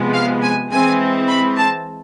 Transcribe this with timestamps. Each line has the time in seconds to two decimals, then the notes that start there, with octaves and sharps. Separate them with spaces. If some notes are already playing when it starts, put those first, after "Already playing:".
Already playing: C3 F3 G#3 B3
0.14 F5
0.43 G#5
0.72 E3 G#3 C4 G#5
1.29 B5
1.57 A5